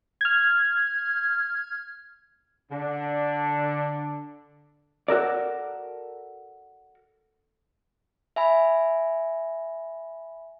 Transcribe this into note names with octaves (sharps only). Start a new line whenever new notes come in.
F6 G#6
D3 D4
F#4 A4 A#4 D5
E5 G#5 B5